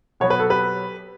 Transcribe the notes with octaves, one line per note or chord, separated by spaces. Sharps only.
B2 F#3 B3 C#5
B4
A4
G4 B4